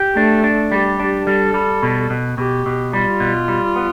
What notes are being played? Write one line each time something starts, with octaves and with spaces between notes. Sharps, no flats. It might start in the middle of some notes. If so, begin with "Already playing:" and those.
Already playing: G4
A3 D4
D4
G3 G4
D4
G3 A4
G3
B2
B2
B2 G4
B2
G3 F4
B2
G3
B3